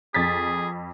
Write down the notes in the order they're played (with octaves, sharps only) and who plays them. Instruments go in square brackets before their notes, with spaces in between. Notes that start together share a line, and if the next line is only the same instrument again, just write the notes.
[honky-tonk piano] F2 A6 B6 [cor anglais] G#4